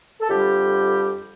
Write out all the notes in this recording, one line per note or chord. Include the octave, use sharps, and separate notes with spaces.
A4
F2 D3 G3 G4